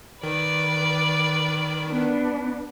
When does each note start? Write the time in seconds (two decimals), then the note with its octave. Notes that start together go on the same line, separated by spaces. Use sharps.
0.23 D#3 B4 D5
1.88 B3 D4